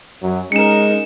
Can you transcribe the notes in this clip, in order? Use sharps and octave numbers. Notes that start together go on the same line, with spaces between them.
F#2 F#3
G#3 C#4 D#4 A#4 C#7 E7